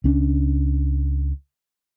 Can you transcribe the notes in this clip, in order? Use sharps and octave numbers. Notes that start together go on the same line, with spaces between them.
C#2 C#4 D4